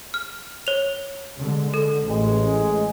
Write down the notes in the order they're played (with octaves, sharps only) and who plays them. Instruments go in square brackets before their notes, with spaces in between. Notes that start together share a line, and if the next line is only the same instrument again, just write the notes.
[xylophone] F6
C#5 F7
[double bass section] D3 G#3
[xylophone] A4
[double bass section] A1 [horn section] G#3